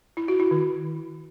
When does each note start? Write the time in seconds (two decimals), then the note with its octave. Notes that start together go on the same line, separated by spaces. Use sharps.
0.17 E4
0.28 F#4
0.40 E4
0.51 D#3